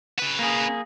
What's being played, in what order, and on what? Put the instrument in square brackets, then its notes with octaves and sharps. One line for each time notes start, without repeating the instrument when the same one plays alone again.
[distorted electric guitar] C#3 B4
[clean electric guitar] A#3 G#4